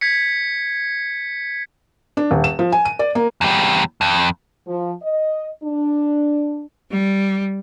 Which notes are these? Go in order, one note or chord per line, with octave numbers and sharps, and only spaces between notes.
G#6 B6 C#7
D4
D#1
E7
F3
G#5
D#7
D5
A#3
E2 G3
F2
F3
D#5
D4
G3